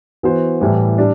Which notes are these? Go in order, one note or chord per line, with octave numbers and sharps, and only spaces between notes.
E3 B3 F#4 C5
A2 E3 G3
G3 D4